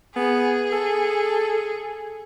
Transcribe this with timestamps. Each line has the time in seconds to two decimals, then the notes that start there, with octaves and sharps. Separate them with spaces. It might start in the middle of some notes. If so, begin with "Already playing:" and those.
0.16 B3 G#4
0.72 A4